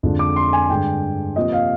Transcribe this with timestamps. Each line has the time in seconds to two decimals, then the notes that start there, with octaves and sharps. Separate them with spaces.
0.03 F2 D3 G#3 D4 F4
0.19 D6
0.36 C6
0.53 G#5
0.70 G2 D3 G#3 D4 G5
1.36 C3 F3 A#3 F4 D#5
1.53 F5